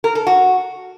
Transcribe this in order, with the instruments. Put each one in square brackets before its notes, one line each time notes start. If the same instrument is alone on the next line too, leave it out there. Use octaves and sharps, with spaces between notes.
[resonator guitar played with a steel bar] A#4
A4
F#4